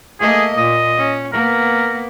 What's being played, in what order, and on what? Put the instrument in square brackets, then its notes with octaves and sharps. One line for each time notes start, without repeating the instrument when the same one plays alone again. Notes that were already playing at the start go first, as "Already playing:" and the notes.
[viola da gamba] A3 A#3 D#5 [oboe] G#4
[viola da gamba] A#2 [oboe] D#5
[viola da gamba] C#4
[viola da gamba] A#3 B3 [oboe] A#4